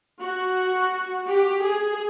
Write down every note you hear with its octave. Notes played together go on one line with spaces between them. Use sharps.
F#4
G4
G#4